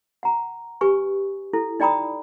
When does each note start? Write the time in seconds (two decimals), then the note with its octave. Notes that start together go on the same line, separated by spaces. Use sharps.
0.23 F#5 A#5
0.81 G4 B4 G#5 C#6
1.53 E4 A4
1.80 D#4 D5 G5 A#5 B5 D#6